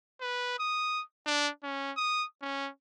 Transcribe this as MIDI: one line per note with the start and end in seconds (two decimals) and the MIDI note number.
0.21 0.58 71
0.59 1.02 87
1.26 1.50 62
1.63 1.92 61
1.97 2.25 87
2.42 2.69 61